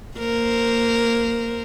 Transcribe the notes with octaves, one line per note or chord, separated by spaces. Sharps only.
A#3 A#4 C5